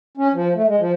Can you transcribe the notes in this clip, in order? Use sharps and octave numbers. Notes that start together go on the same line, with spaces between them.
C#4
F3
A3
G#3
F3